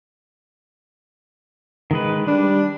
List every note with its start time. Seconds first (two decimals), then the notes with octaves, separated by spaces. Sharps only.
1.91 D#3 G#3 B4
2.27 G3 D4